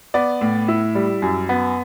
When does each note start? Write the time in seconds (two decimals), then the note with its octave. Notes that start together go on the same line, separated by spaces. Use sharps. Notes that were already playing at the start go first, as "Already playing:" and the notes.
0.14 B3 D5
0.41 A2
0.68 E4
0.95 G3
1.22 F#2
1.49 B3